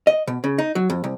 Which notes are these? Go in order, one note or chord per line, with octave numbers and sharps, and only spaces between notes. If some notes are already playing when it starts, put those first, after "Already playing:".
D#5
B2
C#3
D#4
F#3
F2
C2